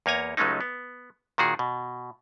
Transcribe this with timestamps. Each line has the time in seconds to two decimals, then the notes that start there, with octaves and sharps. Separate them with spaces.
0.06 E2 A#3 C#5 G#5 A#5
0.37 C#2 F#3 G#3 A3 C#4 D#4
0.61 B3
1.38 A#2 D#3 F#4 G#4
1.59 B2